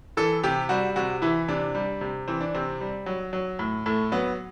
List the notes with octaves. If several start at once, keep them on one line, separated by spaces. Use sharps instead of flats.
E3 A4
C3 G4
G3 F#4
C3 F#4
E3 E4
C3 D4
G3
C3
E3 C4
D4
C3 C4
G3
F#3
F#3
A2
A2 A3
F#3 B3